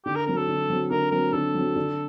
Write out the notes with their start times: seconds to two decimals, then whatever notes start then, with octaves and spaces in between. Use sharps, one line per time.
0.05 D3 G4
0.15 A#4
0.26 F#3 C4 A#4
0.37 A4
0.48 D3
0.69 F#3 C4
0.90 D3 A#4
1.11 F#3 C4 A#4
1.33 D3 A4
1.54 F#3 C4
1.76 D3